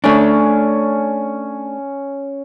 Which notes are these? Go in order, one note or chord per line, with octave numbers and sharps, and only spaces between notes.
A3 C#4 D4